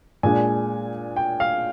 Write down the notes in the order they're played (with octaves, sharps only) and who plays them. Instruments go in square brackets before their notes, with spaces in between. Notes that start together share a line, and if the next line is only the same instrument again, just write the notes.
[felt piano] A#2 G#3 D4 [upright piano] G#5
[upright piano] G5
F5